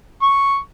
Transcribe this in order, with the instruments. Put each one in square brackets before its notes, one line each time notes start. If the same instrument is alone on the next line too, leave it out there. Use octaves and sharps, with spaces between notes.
[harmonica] C#6